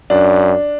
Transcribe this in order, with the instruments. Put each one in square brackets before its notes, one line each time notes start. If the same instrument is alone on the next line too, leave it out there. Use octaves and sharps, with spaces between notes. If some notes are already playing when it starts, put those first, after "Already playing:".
[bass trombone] F#2 [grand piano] D4